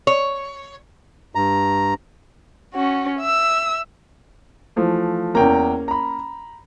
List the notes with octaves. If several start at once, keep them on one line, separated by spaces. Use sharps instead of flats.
C#5
G2 A#5
C#4 F#4
E5 E6
E3 F3 A3
E2 A#3 C#4 G5 A#5
A#5 B5